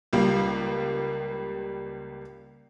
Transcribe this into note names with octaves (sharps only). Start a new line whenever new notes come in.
C#2 G3 A#3